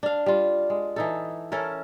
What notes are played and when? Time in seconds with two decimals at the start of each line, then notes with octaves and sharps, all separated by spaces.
0.03 D4 F5
0.26 G3 F4
0.70 G#3
0.96 E3 D#4 A4
1.52 C#4 E4 A4 A#4